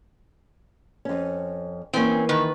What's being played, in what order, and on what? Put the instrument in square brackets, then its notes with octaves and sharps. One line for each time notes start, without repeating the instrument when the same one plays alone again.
[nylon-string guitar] F2 C#4
[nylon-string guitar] E3 A#3 [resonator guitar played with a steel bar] C4 C#4
[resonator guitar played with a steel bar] D#3 B4